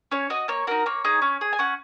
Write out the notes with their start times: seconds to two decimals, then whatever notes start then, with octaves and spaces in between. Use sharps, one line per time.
0.11 C#4 C#5
0.30 F#4 D#5
0.48 A#3 C#5
0.67 D#4 F#4 A#4
0.86 A#3 C#5
1.04 D#4 G#4
1.22 C#4
1.41 G#4
1.53 G#5
1.59 C#4 F#5